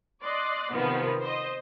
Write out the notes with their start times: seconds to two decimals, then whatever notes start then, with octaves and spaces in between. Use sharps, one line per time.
0.22 D5 D#5 C6 F#6
0.72 C3 D#3 F3 B3 A#4
1.22 C5 D#5